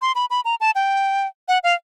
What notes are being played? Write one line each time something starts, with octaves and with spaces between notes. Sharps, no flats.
C6
B5
B5
A#5
A5
G5
F#5
F5